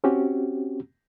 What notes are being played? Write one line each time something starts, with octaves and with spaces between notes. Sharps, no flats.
C4 C#4 F#4 G4